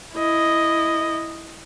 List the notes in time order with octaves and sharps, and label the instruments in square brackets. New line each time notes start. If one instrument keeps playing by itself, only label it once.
[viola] E4 D#5